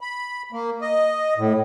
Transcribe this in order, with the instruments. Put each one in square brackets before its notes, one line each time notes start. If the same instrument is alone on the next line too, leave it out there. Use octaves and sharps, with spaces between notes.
[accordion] B5
A#3
D#5
A2